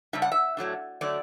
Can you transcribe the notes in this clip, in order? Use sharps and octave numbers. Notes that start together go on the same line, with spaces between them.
C#3 G3 D4 E5
F#5
E5
A2 F#3 A3 D4
D3 F#3 A3 D5